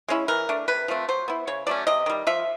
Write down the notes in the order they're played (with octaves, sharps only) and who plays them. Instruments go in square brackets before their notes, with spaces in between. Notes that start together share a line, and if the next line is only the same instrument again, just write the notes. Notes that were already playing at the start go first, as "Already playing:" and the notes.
[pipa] G#3 C#4 E4
E3 A#4
A3 D4
C3 B4
F3 A3 C4
F#3 C5
B3 E4
C#3 C#5
F#3 A3 C#4 D5
C3 D#5
D#3 G3
F3 E5